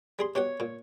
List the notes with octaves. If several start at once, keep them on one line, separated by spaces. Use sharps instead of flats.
G3 G#4 C6
B2 G4 C#5 F#5
A#2